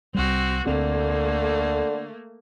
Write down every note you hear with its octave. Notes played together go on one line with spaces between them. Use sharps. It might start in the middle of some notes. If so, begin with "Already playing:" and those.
C2 G3 C4 F#4
D2 D3 A3 A#3 C4